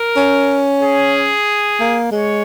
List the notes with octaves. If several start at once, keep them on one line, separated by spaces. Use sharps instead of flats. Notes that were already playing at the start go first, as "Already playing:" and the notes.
Already playing: A#4
C#4
G#4
A#3
G#3 C#5